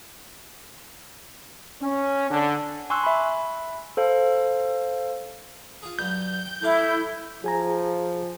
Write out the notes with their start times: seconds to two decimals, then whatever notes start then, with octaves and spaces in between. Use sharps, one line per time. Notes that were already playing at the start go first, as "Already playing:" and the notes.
1.83 C#4
2.30 D3
2.90 G#5 C6 C#6 E6 F#6
3.04 E5 B5
3.97 A4 C5 F5
5.82 F4 G#4
5.99 G2 F#3 G6
6.46 G5
6.62 A3 E4 F5 D6
7.44 F3 G#4 G#5 A#5